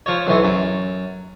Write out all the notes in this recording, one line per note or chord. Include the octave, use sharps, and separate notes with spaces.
F3 C#5
B1 E3 C#6
F#2